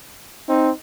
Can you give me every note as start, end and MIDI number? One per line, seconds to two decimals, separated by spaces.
0.49 0.71 60
0.49 0.71 63